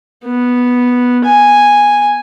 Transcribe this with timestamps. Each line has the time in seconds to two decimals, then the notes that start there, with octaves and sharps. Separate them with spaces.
0.25 B3
1.25 G#5